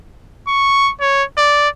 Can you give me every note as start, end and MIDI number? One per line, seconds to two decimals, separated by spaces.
0.48 0.92 85
1.01 1.24 73
1.37 1.69 74